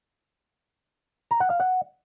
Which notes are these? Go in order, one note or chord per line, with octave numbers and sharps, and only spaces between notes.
A#5
F#5
F5
F#5